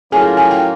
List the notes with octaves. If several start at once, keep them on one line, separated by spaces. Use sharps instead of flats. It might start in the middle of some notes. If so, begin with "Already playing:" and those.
A2 F#3 A#3 C#4 F4 G#4 G#5
G#5
G5